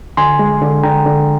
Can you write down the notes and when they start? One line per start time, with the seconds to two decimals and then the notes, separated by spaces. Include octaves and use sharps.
0.17 D3 G#5 C6
0.39 G#3
0.62 D3
0.83 D3 G5 A#5
1.06 D3